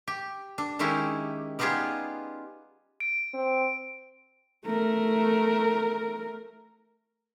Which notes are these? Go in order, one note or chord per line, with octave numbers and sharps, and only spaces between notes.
G4
D4
D#3 G#3 C#4 D#4 E4 G4
G3 B3 D#4 F4 G4 G#4
D7
C4
A3 A#4